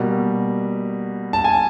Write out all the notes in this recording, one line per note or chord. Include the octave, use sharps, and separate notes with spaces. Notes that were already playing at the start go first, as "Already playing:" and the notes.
Already playing: B2 G3 A#3
A5
G#5